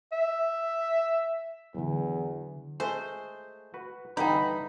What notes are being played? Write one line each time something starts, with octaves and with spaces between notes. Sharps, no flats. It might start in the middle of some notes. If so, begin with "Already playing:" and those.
E5
E2 D3 F#3
G#3 A3 C5 G#5
F#4 B4
G2 D3 E3 D#4 B4 F#5 G5 B5